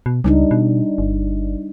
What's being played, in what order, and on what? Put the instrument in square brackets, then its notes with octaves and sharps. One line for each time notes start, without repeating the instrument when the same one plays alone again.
[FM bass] B2
[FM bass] C#2 [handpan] G3 D4 D#4
[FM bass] B2
G1